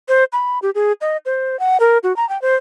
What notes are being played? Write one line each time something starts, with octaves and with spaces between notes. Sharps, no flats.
C5
B5
G4
G#4
D#5
C5
F#5
A#4
F#4
A#5
G5
C5